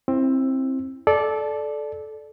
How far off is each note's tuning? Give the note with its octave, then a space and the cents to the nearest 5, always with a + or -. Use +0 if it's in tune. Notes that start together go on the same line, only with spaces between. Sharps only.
C4 +15 E4 +5
A4 -20 D5 +0